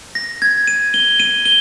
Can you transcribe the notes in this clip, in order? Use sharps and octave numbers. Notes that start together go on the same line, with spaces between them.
A#6
G#6
D#7
G7
D#7
G7